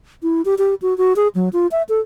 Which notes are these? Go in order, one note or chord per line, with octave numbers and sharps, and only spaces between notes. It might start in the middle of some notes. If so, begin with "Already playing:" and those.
E4
G4
G4
F#4
F#4
G#4
F#3
F4
E5
A4